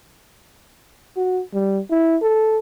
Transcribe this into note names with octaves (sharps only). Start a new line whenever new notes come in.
F#4
G3
E4
A4